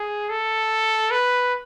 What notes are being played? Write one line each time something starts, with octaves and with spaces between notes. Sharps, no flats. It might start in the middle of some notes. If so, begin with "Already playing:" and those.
Already playing: G#4
A4
B4